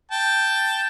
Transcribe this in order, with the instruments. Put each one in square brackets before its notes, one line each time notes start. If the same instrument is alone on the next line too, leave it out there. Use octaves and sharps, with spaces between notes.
[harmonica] G5 A5